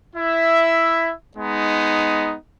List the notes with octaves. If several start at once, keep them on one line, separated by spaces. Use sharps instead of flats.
E4 E5
G#3 B3 D#4